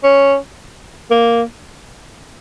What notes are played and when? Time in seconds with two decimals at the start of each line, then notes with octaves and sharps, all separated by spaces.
0.04 C#4
1.11 A#3